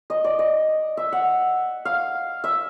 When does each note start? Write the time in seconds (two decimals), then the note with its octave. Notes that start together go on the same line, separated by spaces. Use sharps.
0.10 D#5
0.24 D5
0.39 D#5
0.97 E5
1.12 F#5
1.85 F5
2.44 E5